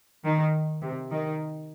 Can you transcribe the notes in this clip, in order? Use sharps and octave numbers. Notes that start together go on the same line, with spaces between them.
D#3
C3
D#3